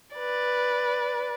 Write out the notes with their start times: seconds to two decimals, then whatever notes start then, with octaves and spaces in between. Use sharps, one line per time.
0.15 B4 D5